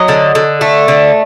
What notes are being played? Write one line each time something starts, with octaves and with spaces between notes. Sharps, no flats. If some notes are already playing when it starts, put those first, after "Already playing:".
Already playing: F#3 D#5
D3
D3
A3
D3